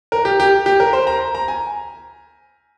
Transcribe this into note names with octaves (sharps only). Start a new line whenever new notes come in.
A#4
G4
G4
G4
A#4
C5
A#5
A#5
G#5